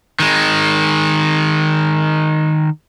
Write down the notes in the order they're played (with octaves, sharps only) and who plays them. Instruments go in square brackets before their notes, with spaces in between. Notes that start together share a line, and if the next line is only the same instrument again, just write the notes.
[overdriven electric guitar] D#3 G#3